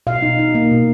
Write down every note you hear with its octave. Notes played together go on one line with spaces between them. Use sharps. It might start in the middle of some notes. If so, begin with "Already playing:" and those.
B2 F5
D#4
D#4
A#3
B2